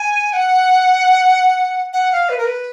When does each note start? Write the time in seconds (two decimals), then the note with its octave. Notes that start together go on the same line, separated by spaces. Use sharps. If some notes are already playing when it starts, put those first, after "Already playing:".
Already playing: G#5
0.33 F#5
1.93 F#5
2.12 F5
2.29 B4
2.37 A#4
2.45 B4